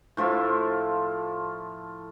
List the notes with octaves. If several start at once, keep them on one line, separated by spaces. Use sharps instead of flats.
A2 F3 F4 E5